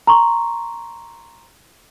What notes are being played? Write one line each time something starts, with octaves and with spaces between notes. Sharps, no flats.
A#5 C6 C#6